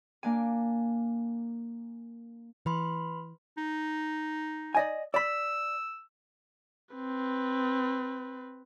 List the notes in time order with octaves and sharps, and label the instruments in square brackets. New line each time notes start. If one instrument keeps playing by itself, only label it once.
[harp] A#3 D4 G#5
[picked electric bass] E3 [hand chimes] B4 B5 C6
[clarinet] D#4
[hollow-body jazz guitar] D5 D#5 G#5
[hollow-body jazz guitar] D5 B5 [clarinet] E6
[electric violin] C4 B4